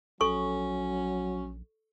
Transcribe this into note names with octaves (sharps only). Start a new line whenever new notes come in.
A#1 F#3 C#4 A4 C#6